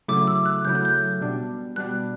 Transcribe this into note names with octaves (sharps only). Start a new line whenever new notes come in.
C#3 F#3 A3 E4 D6
E6
F#6
C#3 F#3 A3 E4 G6
F#6
G6
B2 G3 D4
B2 G3 D4 F#6